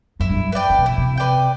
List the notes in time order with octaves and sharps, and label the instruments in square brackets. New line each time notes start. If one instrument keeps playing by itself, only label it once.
[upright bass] F#2 [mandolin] E4
[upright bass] G2
F#2
[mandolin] B4 D5 G5
[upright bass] D3
C3
[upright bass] B2 [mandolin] E4
[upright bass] C3
[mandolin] B4 D5 G5